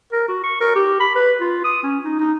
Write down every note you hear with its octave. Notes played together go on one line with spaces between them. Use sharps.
A#4
F#4
C#6
A#4
G4
B5
B4
F4
D#6
C#4
D#4
D#4